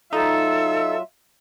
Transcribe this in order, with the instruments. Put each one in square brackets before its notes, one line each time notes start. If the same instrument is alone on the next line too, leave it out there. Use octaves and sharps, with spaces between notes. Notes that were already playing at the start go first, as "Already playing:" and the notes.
[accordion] F#3 F4 [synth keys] D#4 [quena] A4 [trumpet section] E5